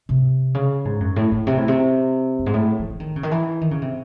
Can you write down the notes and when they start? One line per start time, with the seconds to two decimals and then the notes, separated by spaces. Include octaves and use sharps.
0.09 C3
0.55 C#3
0.85 G#2
1.00 F#2
1.16 A2
1.31 A2
1.47 C3
1.57 A2
1.68 C3
2.39 F#2
2.46 G#2
2.54 A2
2.79 E3
2.90 E3
3.00 D#3
3.16 C#3
3.23 D#3
3.31 E3
3.61 D#3
3.71 C#3
3.82 C3